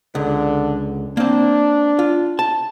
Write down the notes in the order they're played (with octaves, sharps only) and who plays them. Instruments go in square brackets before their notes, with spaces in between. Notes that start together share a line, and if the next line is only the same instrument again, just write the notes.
[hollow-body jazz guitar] C#2 [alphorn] D3
[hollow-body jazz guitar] A#3 C4 [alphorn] D4
[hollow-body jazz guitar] F4
A5